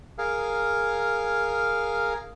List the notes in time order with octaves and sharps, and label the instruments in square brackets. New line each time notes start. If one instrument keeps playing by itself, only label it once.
[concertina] G#4 A#4 F5